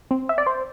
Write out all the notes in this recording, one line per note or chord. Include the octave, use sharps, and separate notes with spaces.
C4
E5
D5
C5